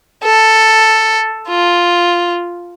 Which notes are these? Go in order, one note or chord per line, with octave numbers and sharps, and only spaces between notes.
A4
F4